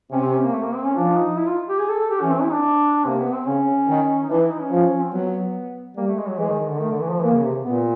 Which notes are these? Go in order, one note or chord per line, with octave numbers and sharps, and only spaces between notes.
C3 C#4
C4
C#4
A#3
A3
A#3
C4
C#4
F3 D4
D#4
E4
F4
G4
G#4
A4
A4
G4
E3 C#4
C4
E4
D4
C3 A#3
B3
C4
C#3 C#4
D#3
D#4
E3 D4
E4
D#4
C#4
F3
C4
F#3 B3
G3 A#3
A3
G#3
F#3
E3 G#3
D#3
D#3
D3
D#3 A3
D3
E3
F3
E3 A#3
C#3
C3
A#2 B3